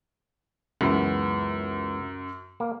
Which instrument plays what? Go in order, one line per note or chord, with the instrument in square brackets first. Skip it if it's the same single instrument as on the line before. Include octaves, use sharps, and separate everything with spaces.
[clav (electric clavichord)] C#2 E3 B3 [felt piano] F#2
[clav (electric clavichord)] A#3